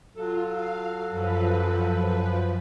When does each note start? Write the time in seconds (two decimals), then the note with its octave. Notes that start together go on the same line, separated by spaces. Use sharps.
0.16 F#3 F4 A4
0.45 F5
1.08 F#2 F3 B4